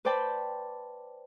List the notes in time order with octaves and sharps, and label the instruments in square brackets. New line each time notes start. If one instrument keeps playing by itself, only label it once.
[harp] B4 C5 D5 G5 A5 B5